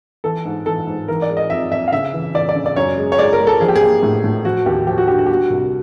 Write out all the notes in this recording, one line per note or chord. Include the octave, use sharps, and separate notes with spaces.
E3 A4
G#2
E3 A4
G#2
E3 A#4
D5
G#3
D#5
F2 E5
F2 E5
F5
C#3 E5
E3
E3 D5
D5
C#3
D5
F#2 C#5
G#3
C#5
G#3 D5
A#4
G#3
A4
F3 G#4
G4
G#4
A#3
A2
A2
F3 F#4
D#2 G4
F3 G4
F#4
D3 G4
F#4
G4
G3 F#4
C2